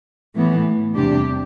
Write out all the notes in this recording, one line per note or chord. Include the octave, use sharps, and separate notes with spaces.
A2 E3 B3
E2 C3 G3 D4 G4